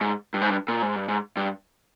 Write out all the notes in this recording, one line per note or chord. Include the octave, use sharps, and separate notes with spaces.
G#2
G2
G#2
G2
A#2
G#2
G2
G#2
G2